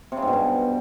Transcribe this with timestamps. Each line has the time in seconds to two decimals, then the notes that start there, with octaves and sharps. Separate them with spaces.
0.12 C3
0.17 C#3
0.22 G#2
0.28 B2
0.33 G2